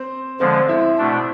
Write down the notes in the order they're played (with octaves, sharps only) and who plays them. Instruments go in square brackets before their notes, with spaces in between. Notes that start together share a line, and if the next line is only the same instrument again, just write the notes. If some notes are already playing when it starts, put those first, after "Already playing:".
Already playing: [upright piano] C4 C5
[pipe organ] D3 F3 G#3 [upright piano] C4 C5
[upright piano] E4 E5
[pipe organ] B2 A3 D4